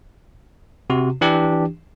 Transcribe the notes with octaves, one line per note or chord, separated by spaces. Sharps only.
C3 F#4
E3 D4 G4